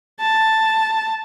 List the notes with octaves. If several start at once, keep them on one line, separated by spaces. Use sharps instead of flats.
A5